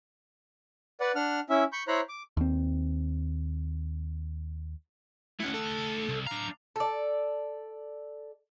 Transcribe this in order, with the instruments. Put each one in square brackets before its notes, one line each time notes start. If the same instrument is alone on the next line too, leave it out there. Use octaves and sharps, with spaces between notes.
[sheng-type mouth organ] B4 D5 F#5
D4 F#5 F6
C#4 E4 E5
B5 C#6 G6
E4 C5 C#5 A#5 B5 F#6
D6
[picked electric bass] D#2 C4
[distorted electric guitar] A3 F#5 [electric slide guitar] C#4 E4
[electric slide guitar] A4
[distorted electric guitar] C2
[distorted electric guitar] D4 F5 [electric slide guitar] A#5
[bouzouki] A4 D5